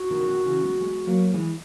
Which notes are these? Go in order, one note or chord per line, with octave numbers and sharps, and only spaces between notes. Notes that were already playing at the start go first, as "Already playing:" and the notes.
Already playing: F#4
B2 D#3
C#3
B2 D#3
C#3 E3
G#3 B3
G#3 B3
F#3 A#3
E3 G#3